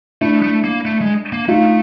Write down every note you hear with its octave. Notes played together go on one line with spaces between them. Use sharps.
A3 D4 E4
A3
A#3
A3
G#3
A#3
A3 D#4 F4